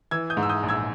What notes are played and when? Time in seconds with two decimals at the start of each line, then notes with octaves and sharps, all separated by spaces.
0.11 E3 E6 G#6
0.30 D#6 G6
0.37 G#2
0.43 E6
0.49 D#6 G6
0.63 A#1
0.68 E6 G#6